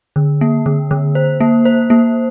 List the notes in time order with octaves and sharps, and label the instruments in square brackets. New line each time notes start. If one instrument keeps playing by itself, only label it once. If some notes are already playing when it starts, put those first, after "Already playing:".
[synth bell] D3
A#3
D3
D3
C5
A#3
C5
A#3